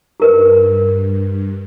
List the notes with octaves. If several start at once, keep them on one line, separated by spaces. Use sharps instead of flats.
G2 G4 A#4 B4